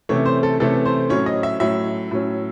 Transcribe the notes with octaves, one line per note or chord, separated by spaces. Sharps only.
C3 E3 A3 C#4 C#5
C5
A4
C3 E3 A3 C#4 A4
C5
A2 F#3 C#4 C#5
D#5
E5
A2 F#3 C#4 E5
A2 F#3 C#4